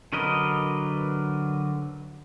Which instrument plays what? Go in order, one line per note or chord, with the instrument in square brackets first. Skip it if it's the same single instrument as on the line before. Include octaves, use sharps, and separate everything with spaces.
[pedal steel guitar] D3 F#3 A#4 B4 D#5